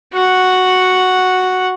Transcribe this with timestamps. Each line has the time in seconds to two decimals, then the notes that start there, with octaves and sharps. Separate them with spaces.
0.14 F#4 F#5